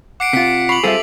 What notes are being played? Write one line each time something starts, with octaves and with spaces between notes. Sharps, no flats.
F#5 D6 C7 D7
C3 F4 B6 D7
B5 C#6 C7 F7 F#7
G3 C4 F4 G#4 A4 E5